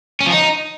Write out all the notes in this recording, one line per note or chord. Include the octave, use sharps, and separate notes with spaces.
C#4
F3
D#4